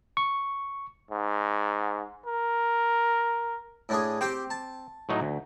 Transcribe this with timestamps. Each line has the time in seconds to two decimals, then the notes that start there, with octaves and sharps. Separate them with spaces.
0.17 C#6
1.11 G#2
2.26 A#4
3.89 A2 D4 G#4
4.21 C4 G4 G5 D6
4.50 A5
5.09 A2 F#3 D#4
5.21 D2